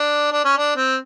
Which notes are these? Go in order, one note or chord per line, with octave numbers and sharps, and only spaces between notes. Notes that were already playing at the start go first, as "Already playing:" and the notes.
Already playing: D4
D4
C#4
D4
C4